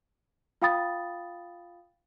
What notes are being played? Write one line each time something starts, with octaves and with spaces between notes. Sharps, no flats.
F4 F5 G5 B5 D#6 A6